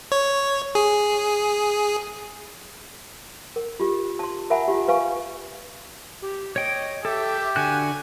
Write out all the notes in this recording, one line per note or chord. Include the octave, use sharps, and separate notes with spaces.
C#5
G#4
A#4
F4 G4
A5 C6
A#4 E5 F#5 G#5 A#5 B5
F4 G4
B4 F5 G#5 C#6
G4
C#5 D#5 G5
G4 A4 E5
D3 F#4 G#5 F#6